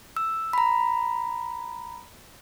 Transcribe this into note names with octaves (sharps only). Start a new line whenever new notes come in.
E6
A#5 B5